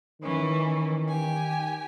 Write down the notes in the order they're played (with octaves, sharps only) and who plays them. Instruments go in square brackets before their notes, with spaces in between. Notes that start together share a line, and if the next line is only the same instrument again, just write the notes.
[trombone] D#3 [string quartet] E3 C#4
[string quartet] G4 G#5